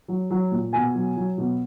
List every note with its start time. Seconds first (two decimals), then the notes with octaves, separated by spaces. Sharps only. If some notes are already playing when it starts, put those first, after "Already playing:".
0.08 F#3
0.31 F#3
0.51 A#2
0.73 B2 G#5
0.95 F#3
1.16 F#3
1.38 B2